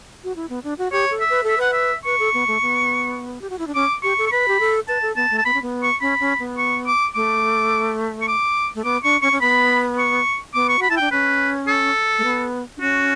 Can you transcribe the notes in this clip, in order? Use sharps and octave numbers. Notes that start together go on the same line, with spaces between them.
F#4
E4
B3
D4
F#4
G4 C#5
A4
E5
B4
A4 E5
B4 F#5
E5
B4 C#6
A4
B3
A3
B3
G4
F#4
E4
D4
C#4 D6
G4 C#6
A4
C#6
B4 B5
G4
A4
B4 A5
A4
B3 A5
A3
A5
B3 B5
C#4
B3
C#6
C#4 B5
C#4
B3
C#6
D6
A3 D6
C#6
D6
A3
B3 D6
D4 C#6
C#4 C#6
C#4
B3 B5
C#6
B3 D6
C#6
F#4 B5
E4 A5
D4 G5
C#4 B4
A4
A3
B3
D4
C#4 F#4